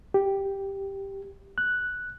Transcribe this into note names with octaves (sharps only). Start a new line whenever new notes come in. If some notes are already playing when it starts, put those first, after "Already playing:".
G4
F#6